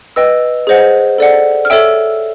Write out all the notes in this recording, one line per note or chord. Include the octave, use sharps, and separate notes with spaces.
B4 D#5 G5 E6
G#4 C5 D#5 F#5
A4 D5 F#5
F6
A4 C#5 E5 G5 E6